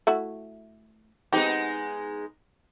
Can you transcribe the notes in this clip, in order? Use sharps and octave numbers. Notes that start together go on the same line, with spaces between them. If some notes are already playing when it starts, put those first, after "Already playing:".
A3 E4 F#4
G#3 B3 C4 D#4 G4